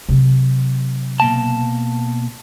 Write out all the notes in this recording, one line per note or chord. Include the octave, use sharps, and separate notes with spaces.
C3 F#3
B2 A#3 A5